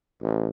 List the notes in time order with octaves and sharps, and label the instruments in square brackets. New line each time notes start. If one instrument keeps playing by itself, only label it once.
[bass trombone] A1